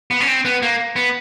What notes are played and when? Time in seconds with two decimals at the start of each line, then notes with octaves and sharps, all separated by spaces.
0.11 B3
0.20 C#4
0.28 C4
0.45 B3
0.62 A#3
0.96 B3